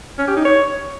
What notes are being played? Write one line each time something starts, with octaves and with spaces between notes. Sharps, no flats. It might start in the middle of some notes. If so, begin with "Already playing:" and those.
C#4
G4
D#4
C#5